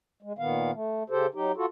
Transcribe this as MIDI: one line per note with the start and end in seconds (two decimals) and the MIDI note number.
0.22 0.33 56
0.39 0.71 46
0.39 0.71 51
0.39 0.71 59
0.39 0.71 77
0.73 1.03 57
1.10 1.27 49
1.10 1.27 67
1.10 1.27 69
1.10 1.27 72
1.34 1.52 54
1.34 1.52 63
1.34 1.52 67
1.56 1.66 65
1.56 1.66 66
1.56 1.66 69